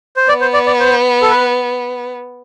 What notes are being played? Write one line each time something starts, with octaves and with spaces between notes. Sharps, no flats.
C5
B3 D5
C5
D5
D5
C5
A4
B4